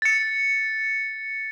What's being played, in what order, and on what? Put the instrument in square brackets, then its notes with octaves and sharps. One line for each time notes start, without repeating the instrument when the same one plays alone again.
[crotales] A6 C#7